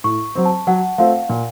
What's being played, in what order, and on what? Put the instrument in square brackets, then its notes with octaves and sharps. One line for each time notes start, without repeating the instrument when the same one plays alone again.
[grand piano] A2 [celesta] C#6
[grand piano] F#3 C4
[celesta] A5
[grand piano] F#3 [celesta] F#5
[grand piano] A3 C4 F4 [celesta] F5
[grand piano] A#2